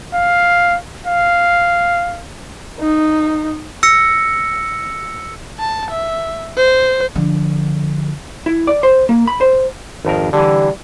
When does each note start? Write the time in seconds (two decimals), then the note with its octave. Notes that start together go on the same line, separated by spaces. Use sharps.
0.13 F5
1.07 F5
2.79 D#4
3.83 E6 A#6 C#7
5.59 A5
5.91 E5
6.57 C5
7.15 D3 F3
8.46 E4
8.67 D5
8.83 C5
9.09 A#3
9.28 B5
9.41 C5
10.05 G#1 F2 A#4
10.33 D3 E3 G3